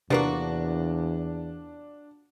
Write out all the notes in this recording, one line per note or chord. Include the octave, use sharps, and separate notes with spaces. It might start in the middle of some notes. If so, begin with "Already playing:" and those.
E2 C3 F3 A#3 D4 F#4 B4